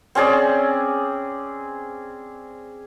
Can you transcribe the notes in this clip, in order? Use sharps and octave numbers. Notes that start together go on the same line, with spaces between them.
C4 C#4 G#4 D5